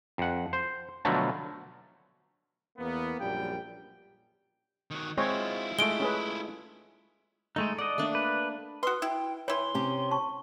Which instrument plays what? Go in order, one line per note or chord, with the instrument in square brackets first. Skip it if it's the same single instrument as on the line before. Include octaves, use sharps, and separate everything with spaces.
[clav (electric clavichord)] F2 F#5
C5
B2 D3 F3 F#3 A3
[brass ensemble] E2 A#3 B3
A#1 F#2 G3 G5
[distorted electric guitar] D#3 F#4
[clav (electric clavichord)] G#3 C4 [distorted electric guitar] E4 F4 [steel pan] C#5
[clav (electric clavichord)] G#3 A3 [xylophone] D7 G7
[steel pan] C#4 G#4 B4
[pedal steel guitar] G#3 A3 D#4 [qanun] A4
[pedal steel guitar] D5 D#5 [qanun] F#5
[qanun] A3 A#3 D4
[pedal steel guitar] B4
[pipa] F#4 C6 [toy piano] B4 [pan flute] D#6
[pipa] E4 [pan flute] G5
[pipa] E3 E4 [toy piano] C#5 [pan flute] C6
[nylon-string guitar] C3 C#4 G4
[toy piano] A5 C#6